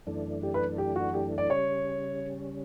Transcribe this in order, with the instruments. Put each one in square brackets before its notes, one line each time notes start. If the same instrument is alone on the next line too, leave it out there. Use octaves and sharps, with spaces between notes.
[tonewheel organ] F#2 E3 A3 D4
[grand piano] G4
B4
G4
F#4
G4
D5
[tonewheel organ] C#3 G3 C#4 [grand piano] C#5